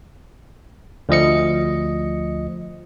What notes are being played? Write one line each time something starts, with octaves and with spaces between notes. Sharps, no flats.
D2 F3 D#5 C#7